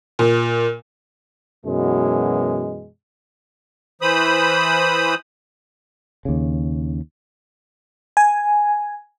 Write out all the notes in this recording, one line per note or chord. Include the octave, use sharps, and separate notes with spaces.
A#2
F#2 B2 E3 G#3
E3 C5 B5 D#6
D#2 C#3
G#5